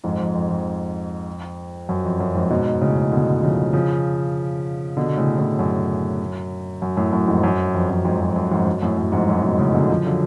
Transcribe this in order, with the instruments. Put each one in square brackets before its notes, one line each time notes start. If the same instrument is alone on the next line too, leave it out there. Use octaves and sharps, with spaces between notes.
[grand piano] F2 G#2
F2
F2
F2
F#2
F2
F#2
F2 G#2
G#2 B2
A2 C#3
B2 D3
C#3 F3
C#3 F3
B2 D3
A2 C#3
A2 C#3
F#2
F#2
F#2 A2
F#2 A2
F2 G#2
F#2
F2
F#2
F2 G#2
F#2
F#2
F2 G#2
F#2
F#2 A2
F#2
F2 G#2
F#2 A2
G#2 B2
A2 C#3
B2 D3
C#3 F3
D3 F#3